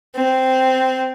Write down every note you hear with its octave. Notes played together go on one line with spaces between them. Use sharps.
C4